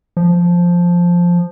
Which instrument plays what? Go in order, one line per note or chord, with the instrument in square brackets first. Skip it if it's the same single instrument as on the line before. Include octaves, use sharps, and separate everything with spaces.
[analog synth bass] F3